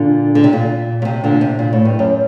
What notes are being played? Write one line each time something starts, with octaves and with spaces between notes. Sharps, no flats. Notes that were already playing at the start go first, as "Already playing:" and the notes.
Already playing: A#2 D3
D3
C3
A#2
A#2
C3
A#2 D3
C3
A#2
A2
G2
F#2